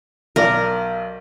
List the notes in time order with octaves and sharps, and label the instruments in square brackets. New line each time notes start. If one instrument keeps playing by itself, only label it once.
[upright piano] B1 D5 [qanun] A#4